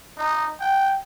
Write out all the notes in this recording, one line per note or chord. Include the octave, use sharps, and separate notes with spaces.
D#4
G5